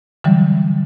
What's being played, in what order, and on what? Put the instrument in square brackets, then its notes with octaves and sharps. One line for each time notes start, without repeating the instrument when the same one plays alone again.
[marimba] D3 E3 F#3 G3